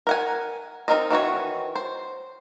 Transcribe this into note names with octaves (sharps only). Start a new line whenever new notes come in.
A#4 F#5 G#5
C4 D#4 A#4 C5 D#5
D#3 E3 F#4 C#5
C5